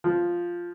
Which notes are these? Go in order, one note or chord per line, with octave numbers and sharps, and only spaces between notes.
F3